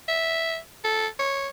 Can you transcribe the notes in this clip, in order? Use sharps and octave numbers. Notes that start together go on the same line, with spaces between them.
E5
A4
C#5